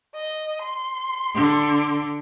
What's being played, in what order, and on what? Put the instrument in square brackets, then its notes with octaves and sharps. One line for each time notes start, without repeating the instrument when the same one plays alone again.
[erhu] D#5
C6
[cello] D3